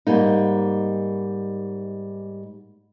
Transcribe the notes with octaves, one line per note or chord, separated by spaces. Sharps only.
G#2 G3 A#3 D#4